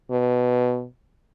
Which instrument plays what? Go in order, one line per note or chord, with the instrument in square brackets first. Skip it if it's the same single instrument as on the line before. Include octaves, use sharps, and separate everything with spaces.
[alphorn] B2